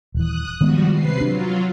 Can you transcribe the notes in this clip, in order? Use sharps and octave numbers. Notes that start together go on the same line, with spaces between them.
D#1 E3 D#6 F#6
D#3 F3 G3 G#3 B3 F#4
C3 B4 C7
F#3 D4 F4